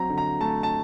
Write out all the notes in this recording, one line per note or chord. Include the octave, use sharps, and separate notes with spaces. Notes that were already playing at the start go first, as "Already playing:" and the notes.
Already playing: F#3 C4 A#5
D3
A#5
A3 A5
A5